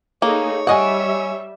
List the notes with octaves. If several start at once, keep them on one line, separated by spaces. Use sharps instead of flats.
A3 A#3 D#4 G#4 C#5
G3 D#5 E5 F#5 G#5 C#6